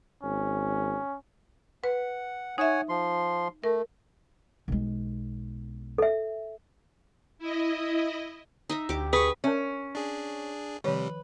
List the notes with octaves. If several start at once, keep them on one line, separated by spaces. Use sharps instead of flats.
G#1 C#4
B4 F#5
D#4 C#5 E5 F#5 G#5
F3 C6
A3 A#4
B1 G#3
A4 E5
E4 D#5
D#4 D#5 E5
D2 G4 D6
G#4 B4 C#6
C#4 A#4 E5
D4 G#4
C3 D#3 F3 G3 B4 C#5